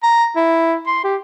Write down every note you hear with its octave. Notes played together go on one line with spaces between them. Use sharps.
A#5
E4
C6
G4